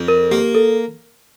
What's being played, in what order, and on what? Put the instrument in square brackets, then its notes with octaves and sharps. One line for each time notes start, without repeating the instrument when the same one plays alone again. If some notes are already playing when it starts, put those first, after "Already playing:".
Already playing: [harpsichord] F2
[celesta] A#4
[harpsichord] A#3 [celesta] G4
[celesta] A4